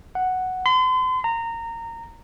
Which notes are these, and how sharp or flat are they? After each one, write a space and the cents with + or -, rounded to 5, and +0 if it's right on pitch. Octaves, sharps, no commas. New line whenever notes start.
F#5 +0
C6 -40
A#5 -20